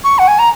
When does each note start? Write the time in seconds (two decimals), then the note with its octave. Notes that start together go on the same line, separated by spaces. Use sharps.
0.04 C#6
0.19 F#5
0.28 G#5
0.39 A#5